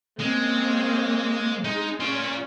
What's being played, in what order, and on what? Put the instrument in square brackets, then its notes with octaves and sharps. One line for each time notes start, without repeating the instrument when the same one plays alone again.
[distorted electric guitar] G#3 [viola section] A#3 C4 C#4
[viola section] G#3 [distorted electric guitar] D#4
[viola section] C#4 [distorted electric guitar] F4 D5